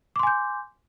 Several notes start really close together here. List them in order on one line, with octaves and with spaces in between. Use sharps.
D6 C6 G#5 G6